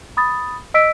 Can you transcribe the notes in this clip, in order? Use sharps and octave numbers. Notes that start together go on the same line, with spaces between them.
B5 D#6 A6
D#5 E6 B6 D7